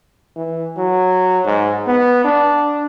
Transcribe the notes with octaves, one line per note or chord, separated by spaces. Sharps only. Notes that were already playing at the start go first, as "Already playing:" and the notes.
E3
F#3
G#2
B3
D4